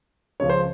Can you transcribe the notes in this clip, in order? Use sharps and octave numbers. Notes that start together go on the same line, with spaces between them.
C#2 C#3 F3 C#5
C5